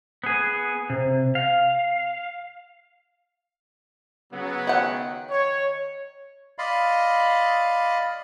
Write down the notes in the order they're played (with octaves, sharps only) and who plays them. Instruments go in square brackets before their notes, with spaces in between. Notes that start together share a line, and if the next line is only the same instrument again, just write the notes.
[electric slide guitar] B3 G#4
C3
F5
[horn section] C#3 F#3 B3
[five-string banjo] D#3 F#5
[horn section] C#5
[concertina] D5 D#5 F5 B5 C6